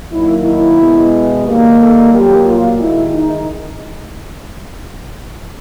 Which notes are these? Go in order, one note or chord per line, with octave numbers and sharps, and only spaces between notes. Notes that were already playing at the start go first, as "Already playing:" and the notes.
D#3 F#3 A#3 E4
E4
B2 G#3
D#3 G3 A#3
A4
A#2 F#3 A#3 G4
F4
D#3 G#3 E4
D#4